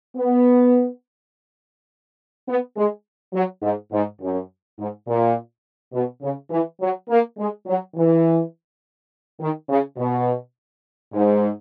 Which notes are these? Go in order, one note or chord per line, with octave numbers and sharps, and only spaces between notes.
B3
B3
G#3
F#3
G#2
G#2
F#2
G#2
A#2
B2
C#3
E3
F#3
A#3
G#3
F#3
E3
D#3
C#3
B2
G#2